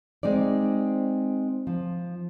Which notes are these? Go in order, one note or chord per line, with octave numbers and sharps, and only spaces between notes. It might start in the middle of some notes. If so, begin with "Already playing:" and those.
G#3 C4 D#4 D5
F3